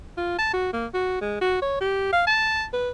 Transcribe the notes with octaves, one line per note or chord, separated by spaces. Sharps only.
F4
A5
F#4
A#3
F#4
G#3
F#4
C#5
G4
F5
A5
B4